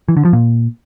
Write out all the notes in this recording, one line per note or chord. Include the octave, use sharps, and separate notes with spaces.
E3
D3
F3
A#2